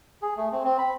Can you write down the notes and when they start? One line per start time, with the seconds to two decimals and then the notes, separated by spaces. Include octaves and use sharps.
0.22 G#4
0.37 A3
0.52 C4
0.64 C4
0.78 B5